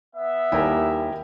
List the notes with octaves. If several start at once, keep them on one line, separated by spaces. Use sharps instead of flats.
B3 E5
D#2 G3 E4 G4 A#4 G#5